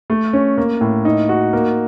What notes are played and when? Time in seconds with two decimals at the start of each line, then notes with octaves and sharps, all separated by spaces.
0.10 A3
0.33 C#4
0.58 A#3
0.81 A2
1.05 D#4
1.29 F#4
1.53 A#3